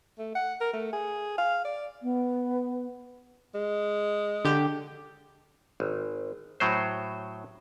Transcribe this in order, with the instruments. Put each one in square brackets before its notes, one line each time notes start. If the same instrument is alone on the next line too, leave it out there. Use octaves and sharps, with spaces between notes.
[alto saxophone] A3
F#5
A#4
A3
G#4
F5
D5
[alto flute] B3
[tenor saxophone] G#3
[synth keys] D3 G4
[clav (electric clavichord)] G#1
A2 F#3 C5